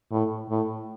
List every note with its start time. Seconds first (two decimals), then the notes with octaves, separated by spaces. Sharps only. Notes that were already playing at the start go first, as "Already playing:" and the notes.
0.11 A2
0.49 A2